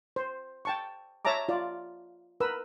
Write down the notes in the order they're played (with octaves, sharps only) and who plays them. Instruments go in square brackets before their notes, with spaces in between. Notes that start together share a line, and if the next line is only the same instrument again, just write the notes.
[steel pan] C5
G5 A5 C#6
C#5 E5 A5 A#5 D6
F4 D5
A#4 B4 E6